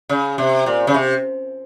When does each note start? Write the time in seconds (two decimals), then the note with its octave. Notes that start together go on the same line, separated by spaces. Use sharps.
0.09 C#3
0.38 C3
0.66 A#2
0.87 C#3
0.94 C3